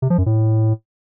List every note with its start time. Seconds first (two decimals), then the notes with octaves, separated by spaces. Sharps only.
0.02 C3
0.10 F3
0.18 F#2
0.26 A2